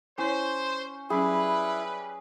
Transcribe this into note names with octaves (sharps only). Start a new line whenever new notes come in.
C#4 E4 C5 C#5
F#3 G3 C#4 E4 G#4 B4